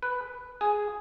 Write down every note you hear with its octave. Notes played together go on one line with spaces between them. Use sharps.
B4
G#4